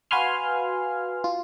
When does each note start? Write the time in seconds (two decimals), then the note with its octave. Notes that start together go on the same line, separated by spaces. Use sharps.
0.11 F#4 B4 F5 G#5 C6 F6
1.24 F4